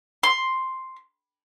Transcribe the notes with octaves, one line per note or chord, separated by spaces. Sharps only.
C6